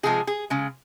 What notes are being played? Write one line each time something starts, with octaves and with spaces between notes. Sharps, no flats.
C3 F3 G#3 G#4
G#4
C#3 G#3